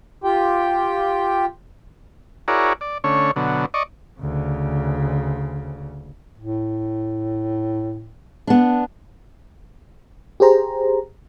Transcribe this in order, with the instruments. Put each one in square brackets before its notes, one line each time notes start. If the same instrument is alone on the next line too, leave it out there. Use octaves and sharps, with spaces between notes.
[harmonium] F4 G4 G5
[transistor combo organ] E4 F#4 G#4 A#4 C#5 D5
D5
D3 A3 C#4 C#5
B2 D3 F#3
D5 D#5 C#6
[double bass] D2 C#3
[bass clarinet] A2
[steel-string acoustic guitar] B3 D4
[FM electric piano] G4 G#4 C5 A#5